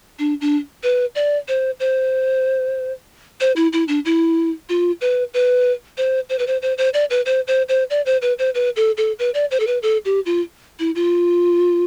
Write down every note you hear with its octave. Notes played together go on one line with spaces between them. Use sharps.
D4
D4
B4
D5
C5
C5
C5
E4
E4
D4
E4
F4
B4
B4
C5
C5
B4
C5
C5
C5
D5
B4
C5
C5
C5
D5
C5
B4
C5
B4
A4
A4
B4
D5
C5
A4
B4
A4
G4
F4
E4
F4